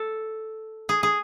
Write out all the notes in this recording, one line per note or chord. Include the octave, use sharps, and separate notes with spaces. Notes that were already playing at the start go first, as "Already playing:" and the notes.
Already playing: A4
G#4
G#4